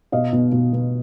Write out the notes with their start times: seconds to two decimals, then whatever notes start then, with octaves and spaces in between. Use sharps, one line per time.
0.12 B2 D#5 F5
0.33 B2
0.52 B2
0.73 B2